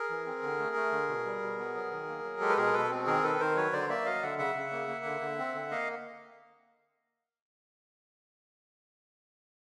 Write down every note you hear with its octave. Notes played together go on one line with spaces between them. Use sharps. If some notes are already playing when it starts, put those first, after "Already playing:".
Already playing: G#4 A#4
E3
C4
D3
A3
A3
D3
B2
G3
B2
B3
F#3
D#3
A#3
F#3
G#3 G4 A4
B4
B2 G#4 A#4
B2 A4 B4
C4
D#3 G#4 A#4
D#3 A4 B4
D#3 A#4 C5
F#3 B4 C#5
D3 C5 D5
A#3 D5 E5
F#3 D#5 F5
D3 E5 F#5
C#3 E5 F#5
C#3
A#3
A#3
D3
D3
C4
D3
A#3 D#5 F5